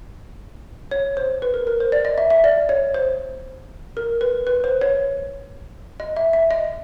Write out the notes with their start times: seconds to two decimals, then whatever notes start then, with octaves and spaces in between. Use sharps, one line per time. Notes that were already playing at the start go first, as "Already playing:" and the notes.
0.91 C#5
1.17 C5
1.42 B4
1.54 A#4
1.67 A#4
1.80 C5
1.92 D5
2.05 D#5
2.18 E5
2.30 E5
2.44 D5
2.69 C#5
2.94 C5
3.97 A#4
4.21 B4
4.47 B4
4.64 C5
4.81 C#5
6.00 D#5
6.17 E5
6.33 E5
6.51 D#5